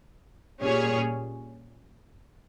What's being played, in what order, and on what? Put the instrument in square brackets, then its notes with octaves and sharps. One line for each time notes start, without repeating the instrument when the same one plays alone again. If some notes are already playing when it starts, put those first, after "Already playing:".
[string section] A#2 G3 C#4 G#4 C#5